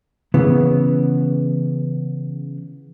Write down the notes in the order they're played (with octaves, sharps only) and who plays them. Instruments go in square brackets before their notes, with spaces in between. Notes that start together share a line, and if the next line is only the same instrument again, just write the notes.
[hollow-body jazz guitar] C#3 E3 B3